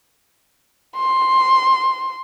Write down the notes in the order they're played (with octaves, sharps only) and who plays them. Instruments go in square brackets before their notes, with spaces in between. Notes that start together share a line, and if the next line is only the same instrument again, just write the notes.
[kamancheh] C6